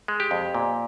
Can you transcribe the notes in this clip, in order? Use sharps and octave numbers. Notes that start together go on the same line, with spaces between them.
G#3
G4
F2
A#2